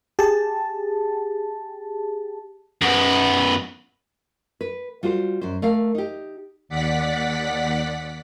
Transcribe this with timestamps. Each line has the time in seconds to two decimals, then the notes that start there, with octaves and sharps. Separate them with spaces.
0.19 G4 G#4 A5
2.82 F#2 B3
4.61 B4
5.03 G3 F4 F#4 C5
5.41 F#2 C5
5.62 A3 A#4 F5
5.95 D#4 G4
6.69 D#2 D5 F#5 B6